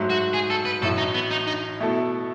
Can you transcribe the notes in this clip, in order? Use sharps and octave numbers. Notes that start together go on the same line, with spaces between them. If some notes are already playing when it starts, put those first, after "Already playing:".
Already playing: G#2 F#3 A3
F#4
G#4
A4
B4
A1 A2 F#3 A3 E4 A4
D#4
B3
D#4
D#4
B2 A3 E4 A4